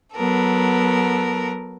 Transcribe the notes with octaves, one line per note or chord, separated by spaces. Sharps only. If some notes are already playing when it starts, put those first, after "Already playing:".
F#3 B3 A4 A#4